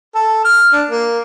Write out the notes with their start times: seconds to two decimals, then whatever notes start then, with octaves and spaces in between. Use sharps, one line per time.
0.15 A4
0.45 F6
0.73 D4
0.89 A#3